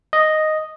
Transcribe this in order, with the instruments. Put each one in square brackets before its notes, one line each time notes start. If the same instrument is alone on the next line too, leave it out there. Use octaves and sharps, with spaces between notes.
[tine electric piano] D#5